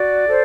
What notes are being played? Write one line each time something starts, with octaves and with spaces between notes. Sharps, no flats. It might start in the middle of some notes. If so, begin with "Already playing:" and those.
Already playing: F#4 D5
A4 C5